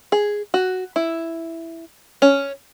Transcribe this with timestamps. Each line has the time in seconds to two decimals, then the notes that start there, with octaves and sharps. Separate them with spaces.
0.12 G#4
0.54 F#4
0.96 E4
2.22 C#4